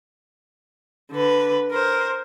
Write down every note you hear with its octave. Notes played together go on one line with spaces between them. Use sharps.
D3 B4
A#4 C5